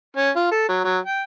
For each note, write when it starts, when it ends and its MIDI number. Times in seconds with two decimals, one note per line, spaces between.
0.16 0.30 61
0.36 0.49 65
0.51 0.65 69
0.69 0.80 54
0.84 0.97 54
1.06 1.22 79